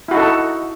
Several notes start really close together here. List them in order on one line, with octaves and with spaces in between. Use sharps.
E4 F#4 D#4 A4